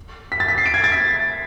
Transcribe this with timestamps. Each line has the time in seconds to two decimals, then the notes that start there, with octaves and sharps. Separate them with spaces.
0.32 B6
0.40 A6
0.48 B6
0.58 C7
0.66 D7
0.74 G#6
0.84 A6
0.92 B6